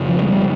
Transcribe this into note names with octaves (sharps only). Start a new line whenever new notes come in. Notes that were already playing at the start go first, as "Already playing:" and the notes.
Already playing: F2 C#3
F3
G#3
G3